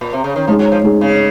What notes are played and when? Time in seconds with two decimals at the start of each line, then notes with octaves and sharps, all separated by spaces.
0.01 A#2
0.13 C3
0.24 C#3
0.36 D#3
0.47 F3 G#3 D#4 G#4
0.59 F#3
0.72 F3
0.83 G#3 D#4 G#4
1.01 C#3